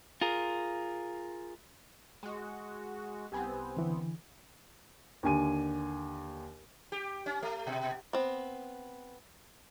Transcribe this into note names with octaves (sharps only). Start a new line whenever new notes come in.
F4 G#4 A#4
G#3 F#4
C2 B3 C4 G4 G#5
D3 E3
D#2 D3 G#5 D#7
G4
C#4
A3
B2
B3 C4